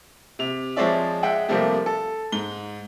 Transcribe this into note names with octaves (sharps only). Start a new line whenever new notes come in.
C3 F7
F3 G#3 C4 C#5 D5 E5
G#3 E5 F#5 G5
C3 F3 G3 A3 A#3 C4
A4
G#2 G7